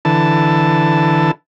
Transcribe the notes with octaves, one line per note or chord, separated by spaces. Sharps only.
D3 E3 A5